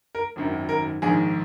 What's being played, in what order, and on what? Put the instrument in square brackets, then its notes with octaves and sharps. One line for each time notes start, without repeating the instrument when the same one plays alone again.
[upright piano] A#4
G#1 F#2 D#3
A#4
A#1 G#2 D#3 G#4